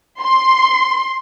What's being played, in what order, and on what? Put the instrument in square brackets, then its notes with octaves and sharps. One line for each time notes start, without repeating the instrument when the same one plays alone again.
[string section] C6